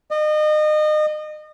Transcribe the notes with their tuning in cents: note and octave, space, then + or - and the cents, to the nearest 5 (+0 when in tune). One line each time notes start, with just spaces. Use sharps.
D#5 -30